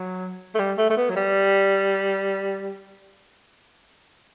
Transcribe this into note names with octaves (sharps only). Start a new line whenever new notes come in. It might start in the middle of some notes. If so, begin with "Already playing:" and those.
Already playing: F#3
A3
G3
A3
A3
B3
F#3
G3